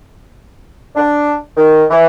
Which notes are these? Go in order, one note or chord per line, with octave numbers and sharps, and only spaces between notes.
D4
D#3
E3